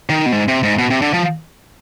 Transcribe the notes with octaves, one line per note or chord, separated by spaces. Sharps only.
D#3
B2
G#2
C3
G#2
B2
C3
D3
F3